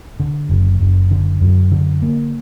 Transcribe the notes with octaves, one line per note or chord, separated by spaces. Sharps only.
D3
F#1
F#1
D3
F#2
D3
A#3